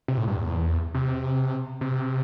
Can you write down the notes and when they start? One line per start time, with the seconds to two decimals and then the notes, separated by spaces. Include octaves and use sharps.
0.08 C3
0.17 A2
0.27 G2
0.37 E2
0.94 C3
1.81 C3